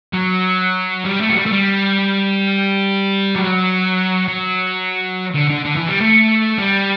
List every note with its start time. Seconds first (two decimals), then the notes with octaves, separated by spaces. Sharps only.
0.13 F#3
1.05 G3
1.21 A3
1.29 F#3
1.37 G3
1.46 A3
1.52 G3
3.35 F#3
4.28 F#3
5.35 D3
5.50 D3
5.66 D3
5.77 E3
5.89 G3
6.01 A3
6.58 G3